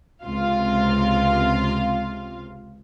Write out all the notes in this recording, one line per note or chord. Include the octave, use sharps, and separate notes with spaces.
C#2 C3 F4 F5